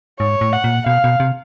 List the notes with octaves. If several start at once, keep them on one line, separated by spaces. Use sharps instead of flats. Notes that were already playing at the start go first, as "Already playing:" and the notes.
G#2 C#5
A2
F#5
A#2
B2 F5
B2
C3